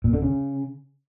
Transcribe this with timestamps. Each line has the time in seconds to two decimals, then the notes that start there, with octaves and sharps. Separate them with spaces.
0.04 A#2
0.13 D3
0.22 C#3